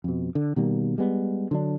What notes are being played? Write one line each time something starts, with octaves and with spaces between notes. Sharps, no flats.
F2 B2
D3
B2 D#3 G3 A#3
G3 G#3 B3
D3 F#3 D4